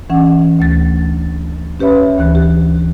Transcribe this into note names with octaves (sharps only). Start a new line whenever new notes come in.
E3 C#4 F#5
D2 A3 A6
C#4 G4 B4 C#5 E5 B5
D2 E3 F#6
G4